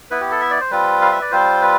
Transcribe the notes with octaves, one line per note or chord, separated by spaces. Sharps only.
B3 E4 B4
G4
A4
E5
D5
C5
G3 C4 F4 B4
F5
E5
D5
G3 C4 F4 C5
B4